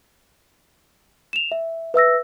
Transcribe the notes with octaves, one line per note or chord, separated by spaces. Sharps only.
E7 F7
E5
B4 E5 E6 A#6